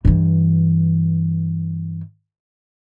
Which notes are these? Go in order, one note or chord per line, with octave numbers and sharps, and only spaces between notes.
G2 E3